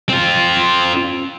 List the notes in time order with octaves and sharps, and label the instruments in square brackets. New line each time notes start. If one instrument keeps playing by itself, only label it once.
[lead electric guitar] C4 F4